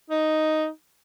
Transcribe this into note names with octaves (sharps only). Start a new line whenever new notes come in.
D#4